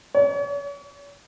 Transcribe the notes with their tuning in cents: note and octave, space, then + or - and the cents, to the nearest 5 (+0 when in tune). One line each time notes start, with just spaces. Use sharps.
C#5 +40